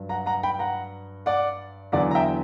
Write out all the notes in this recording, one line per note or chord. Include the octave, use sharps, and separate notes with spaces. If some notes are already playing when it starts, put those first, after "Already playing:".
Already playing: G2 F#3
F#5 A#5
F#5 A#5
G5 B5
F#5 A#5
D5 F#5
E2 D3 F#3 D5 F#5
A#5
E5 G5